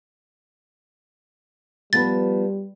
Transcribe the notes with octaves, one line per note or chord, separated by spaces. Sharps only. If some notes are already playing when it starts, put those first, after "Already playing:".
F3 G3 B3 B4 A6